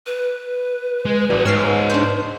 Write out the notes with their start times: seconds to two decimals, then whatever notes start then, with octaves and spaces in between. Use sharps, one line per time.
0.06 B4
1.05 G#3
1.30 A1 G3 F#4 G#4
1.45 G#2 D#4 C#5 E6 F6 C7
1.90 D4 C5